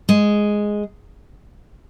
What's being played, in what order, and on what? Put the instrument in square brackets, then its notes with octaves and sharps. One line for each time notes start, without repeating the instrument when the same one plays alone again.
[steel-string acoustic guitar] G#3